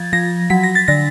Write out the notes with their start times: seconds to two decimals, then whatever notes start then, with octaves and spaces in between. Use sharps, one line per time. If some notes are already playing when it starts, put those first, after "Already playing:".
Already playing: F3 G#6 A6
0.13 F3 A#6
0.50 F#3 B6
0.63 A#6
0.75 A6
0.88 D3 A#6